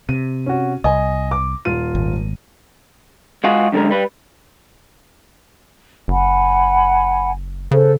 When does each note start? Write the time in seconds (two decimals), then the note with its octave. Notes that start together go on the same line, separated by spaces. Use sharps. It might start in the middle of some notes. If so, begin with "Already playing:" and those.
0.09 C3 D#7
0.46 C#4 F#4
0.84 C2 D#5 G#5
1.31 D6
1.65 D#1 F4 D#7
1.95 G#1
3.44 G#3 F4 F#4 G#4
3.73 F#2 D3 G3 G#3 A#4
3.91 G3 B4
6.08 F#1 F#5 G#5 B5
7.71 C#3 A4 B4 C5